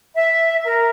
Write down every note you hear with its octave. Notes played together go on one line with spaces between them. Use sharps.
E5
A#4